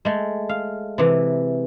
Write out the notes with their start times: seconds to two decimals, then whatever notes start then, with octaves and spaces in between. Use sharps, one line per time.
0.05 G#3 A3
0.49 F5
0.98 C3 E3